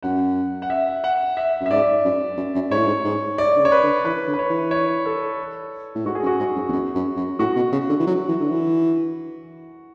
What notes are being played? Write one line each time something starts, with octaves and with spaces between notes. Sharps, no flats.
F#2 F#5
F#5
E5
F#5
E5
F#2
E5
G#2 D5
F#2
F#2
F#2
G#2 C#5
A2
G#2
G#2
D5
D3
C#3
C#5
B4
D3
E3 B4
D3
B4
C#5
E3
C#5
A4
A2
G#2 F#4
G#4
F#2
F#4
G#2
F#2
E2
F#2
F#2
F#2
A2 F#4
B2
C#3
D3
E3
F#3
E3
D3
E3